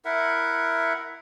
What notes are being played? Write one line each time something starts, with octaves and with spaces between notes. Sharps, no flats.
E4 A#4 E5 F#5